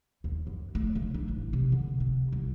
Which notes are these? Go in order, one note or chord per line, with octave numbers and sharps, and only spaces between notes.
D#2
F#2
A3
C#3
D4
A1
C3
D3
C3
C2